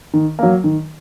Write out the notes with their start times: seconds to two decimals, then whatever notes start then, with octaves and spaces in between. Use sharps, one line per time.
0.14 D#3
0.39 F#3 A#3
0.64 D#3